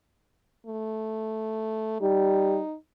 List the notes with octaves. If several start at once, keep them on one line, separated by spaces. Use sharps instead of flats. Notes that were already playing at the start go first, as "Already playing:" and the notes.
A3
G3 D#4